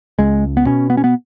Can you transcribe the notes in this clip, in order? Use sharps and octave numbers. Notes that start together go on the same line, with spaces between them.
C#2 G#3
B3
B2 C#4
B3
C#4
B3